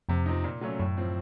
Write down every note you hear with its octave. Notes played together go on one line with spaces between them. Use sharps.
F2 C3
F3 C4 D#4
A#2
F#3 A3 C#4
F#2 A2
F3 C4